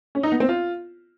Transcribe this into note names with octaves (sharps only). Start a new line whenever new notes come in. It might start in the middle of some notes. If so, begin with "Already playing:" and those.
C#4
D#4
B3
C4
F4